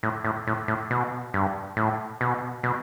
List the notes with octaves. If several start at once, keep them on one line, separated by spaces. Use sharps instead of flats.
A2
A2
A2
A2
B2
G2
A2
B2
B2